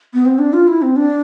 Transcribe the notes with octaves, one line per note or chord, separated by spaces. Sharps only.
B3
C4
D4
F4
E4
C4
D4